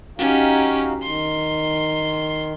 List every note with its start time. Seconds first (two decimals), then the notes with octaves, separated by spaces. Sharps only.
0.19 C#4 D#4 F#4 G4 F5
1.02 D#3 C6